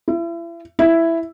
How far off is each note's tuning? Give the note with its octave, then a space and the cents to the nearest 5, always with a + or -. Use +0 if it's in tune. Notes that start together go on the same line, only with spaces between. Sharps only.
E4 +35
E4 +5